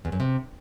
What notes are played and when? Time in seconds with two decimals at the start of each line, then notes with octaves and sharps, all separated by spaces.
0.05 E2
0.12 F#2
0.20 C3